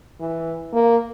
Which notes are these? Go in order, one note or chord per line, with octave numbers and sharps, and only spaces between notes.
E3
A#3